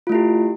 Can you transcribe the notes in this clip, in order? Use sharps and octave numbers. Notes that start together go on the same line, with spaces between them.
A3 E4 F4 G4